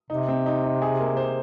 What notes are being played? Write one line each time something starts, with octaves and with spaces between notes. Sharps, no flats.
C3 D#4
C4
D#4
D#4
G#4
A#3
C5